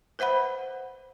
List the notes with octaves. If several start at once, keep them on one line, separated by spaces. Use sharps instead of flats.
B4 C5 E5 F#5 B5